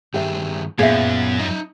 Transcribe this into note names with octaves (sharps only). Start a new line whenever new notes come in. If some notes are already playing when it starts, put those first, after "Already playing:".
G2 D#3 G4 G#4 E5
F#2 A#2 B3 G#4 E5
D#4 D#5 E5